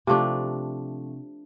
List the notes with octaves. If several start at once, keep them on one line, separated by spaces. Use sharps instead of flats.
C3 F3 A3 D4